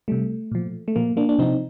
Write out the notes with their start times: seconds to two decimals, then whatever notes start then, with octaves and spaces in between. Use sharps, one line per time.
0.08 C3 G3 A3
0.52 A#2 F3
0.88 A3
0.96 A#2 F3 A#3
1.17 A#3 D4
1.29 D4
1.39 C3 F3 C4 D#4